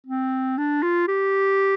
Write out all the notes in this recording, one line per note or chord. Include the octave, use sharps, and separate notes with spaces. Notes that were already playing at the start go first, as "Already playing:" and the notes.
C4
D4
F4
G4